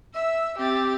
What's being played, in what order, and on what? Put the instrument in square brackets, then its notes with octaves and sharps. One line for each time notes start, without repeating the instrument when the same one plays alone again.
[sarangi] E5 [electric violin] E6
[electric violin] C4 A6 [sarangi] G4